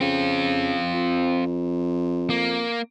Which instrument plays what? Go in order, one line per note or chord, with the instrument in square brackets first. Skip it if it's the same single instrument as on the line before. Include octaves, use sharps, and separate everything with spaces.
[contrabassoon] C#3 [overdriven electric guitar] C4 F4
[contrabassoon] F2
[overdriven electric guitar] A#3